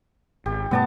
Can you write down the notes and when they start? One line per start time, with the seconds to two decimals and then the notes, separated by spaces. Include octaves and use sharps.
0.46 G#1 G4
0.71 G2 B2 A3 B3 D5 A5